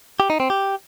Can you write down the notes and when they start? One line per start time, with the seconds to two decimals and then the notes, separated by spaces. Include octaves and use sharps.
0.20 G4
0.30 D#4
0.40 C4
0.50 G4